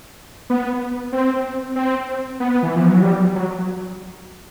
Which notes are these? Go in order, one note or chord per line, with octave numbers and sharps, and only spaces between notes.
B3
C4
C4
B3
E3
F3
F#3
G3
F#3